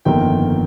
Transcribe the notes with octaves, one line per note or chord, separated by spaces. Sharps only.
G1 F2 D#3 A#3 G5